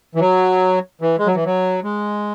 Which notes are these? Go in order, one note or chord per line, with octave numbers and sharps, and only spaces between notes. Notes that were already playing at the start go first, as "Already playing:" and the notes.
E3
F#3
E3
G#3
F#3
E3
F#3
G#3